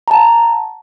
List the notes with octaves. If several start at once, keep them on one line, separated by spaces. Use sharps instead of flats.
F#5 A5 A#5